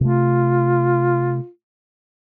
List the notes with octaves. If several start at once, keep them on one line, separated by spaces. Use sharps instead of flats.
C3 A3 F4